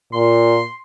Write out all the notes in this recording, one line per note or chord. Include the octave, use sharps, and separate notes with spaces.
A#2 C6